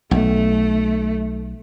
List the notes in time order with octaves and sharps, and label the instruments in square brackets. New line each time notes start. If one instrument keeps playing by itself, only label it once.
[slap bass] B1 [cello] A3